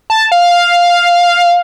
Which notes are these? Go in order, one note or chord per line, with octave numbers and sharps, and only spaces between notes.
A5
F5
F5